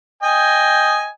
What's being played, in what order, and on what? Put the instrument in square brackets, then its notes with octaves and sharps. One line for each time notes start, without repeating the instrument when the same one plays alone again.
[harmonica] D#5 G5 G#5